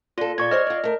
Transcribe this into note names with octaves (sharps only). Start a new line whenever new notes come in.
A#2 F4 A4
A#2 D5 C#6 G#6
G#4 C5 C#5 D#5 F6
F4 D5
A3 A#4